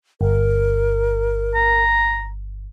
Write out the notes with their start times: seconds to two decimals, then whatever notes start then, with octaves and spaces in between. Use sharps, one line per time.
0.21 G1 A#4
1.55 A#5